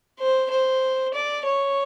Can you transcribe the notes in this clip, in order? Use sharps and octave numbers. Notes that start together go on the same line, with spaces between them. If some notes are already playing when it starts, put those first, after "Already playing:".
C5
C5
D5
C#5